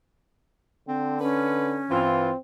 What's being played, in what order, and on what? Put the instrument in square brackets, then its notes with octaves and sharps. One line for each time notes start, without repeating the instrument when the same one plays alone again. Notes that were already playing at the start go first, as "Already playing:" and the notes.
[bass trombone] D3 [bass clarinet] C4
[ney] C#4 [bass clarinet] B4
[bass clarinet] G2 [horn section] E3 F4 [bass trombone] C4